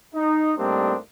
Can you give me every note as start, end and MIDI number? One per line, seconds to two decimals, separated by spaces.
0.15 0.53 63
0.58 0.96 45
0.58 0.96 55
0.58 0.96 58
0.58 0.96 60
0.58 0.96 62
0.58 0.96 63